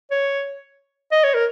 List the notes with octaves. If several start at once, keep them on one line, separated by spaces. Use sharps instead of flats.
C#5
D#5
C#5
A#4